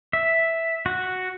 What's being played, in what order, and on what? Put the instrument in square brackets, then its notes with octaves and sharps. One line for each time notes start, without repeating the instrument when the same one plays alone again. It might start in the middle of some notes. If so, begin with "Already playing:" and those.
[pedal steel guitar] E5
F#4